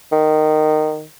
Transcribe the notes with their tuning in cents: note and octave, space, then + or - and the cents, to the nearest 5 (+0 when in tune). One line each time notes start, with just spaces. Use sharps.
D#3 -15